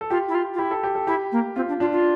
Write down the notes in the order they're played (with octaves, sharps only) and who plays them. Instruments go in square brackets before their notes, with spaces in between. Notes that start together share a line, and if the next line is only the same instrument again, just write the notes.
[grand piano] A4
[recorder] F4 [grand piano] G4
[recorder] E4
F4
F4
[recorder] E4 [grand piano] G4
[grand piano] A4
G4
A4
[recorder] E4 [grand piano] G4
[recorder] A#3
[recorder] C4 [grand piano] F4
[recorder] D4
[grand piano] D4 [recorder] F4
[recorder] F4